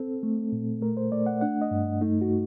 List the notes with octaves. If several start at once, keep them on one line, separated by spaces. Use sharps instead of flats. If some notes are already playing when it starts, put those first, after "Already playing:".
Already playing: C4 A4
A3
A#2
A3 A#4
C5
A3 D5
F#5
D4 F#5
D#5
G2
A3 D#4
F#4